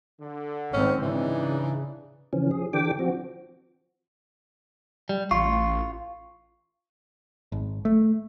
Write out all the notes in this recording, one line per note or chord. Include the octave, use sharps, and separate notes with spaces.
D3
G#1 D#3 C4 C#4
C#3 E3 D4 D#4
C#3 E3 F3 C#4
F3 G#4
D3 E3 D4 G4 G5 D6
F3 C4 F#4
G3
A1 F4 C#6
G#1
A3